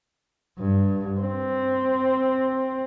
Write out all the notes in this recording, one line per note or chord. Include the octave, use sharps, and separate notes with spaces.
G2
C4